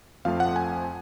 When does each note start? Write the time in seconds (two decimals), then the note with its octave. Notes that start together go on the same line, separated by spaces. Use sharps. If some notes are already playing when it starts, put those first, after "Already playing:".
0.25 F2 F3 A3 F5
0.40 F#5
0.56 G#5